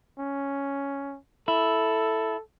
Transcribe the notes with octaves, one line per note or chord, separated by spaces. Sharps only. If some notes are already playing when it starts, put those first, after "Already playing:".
C#4
E4 A4